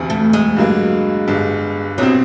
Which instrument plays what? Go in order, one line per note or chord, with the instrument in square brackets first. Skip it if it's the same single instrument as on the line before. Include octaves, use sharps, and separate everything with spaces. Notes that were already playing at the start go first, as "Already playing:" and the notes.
Already playing: [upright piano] E1 D2 C3
[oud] A3
G#3
[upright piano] G2 D3 F#3 A#3
G1 G2 D3
[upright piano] C2 B2 G3 C4 [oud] F#3